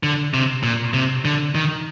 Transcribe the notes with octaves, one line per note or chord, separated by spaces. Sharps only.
D3
C3
A#2
C3
D3
D#3